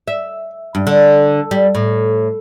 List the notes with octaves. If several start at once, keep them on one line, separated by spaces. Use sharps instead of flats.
E5
G2
D3
G3
A2